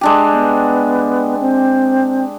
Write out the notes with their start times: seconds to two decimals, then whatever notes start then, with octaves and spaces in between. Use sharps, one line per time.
0.01 G#3 D4 G4
0.33 B3
1.40 C4